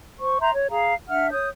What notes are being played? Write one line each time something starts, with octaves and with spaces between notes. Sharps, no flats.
C5 C#6
E5 A#5 C6 G6
C#5
G#4 F5 A#5
D4 E5 F#5 F6
C#5 D#6 G6